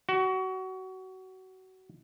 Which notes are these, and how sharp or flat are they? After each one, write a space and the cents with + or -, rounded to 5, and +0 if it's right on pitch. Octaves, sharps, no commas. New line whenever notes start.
F#4 +25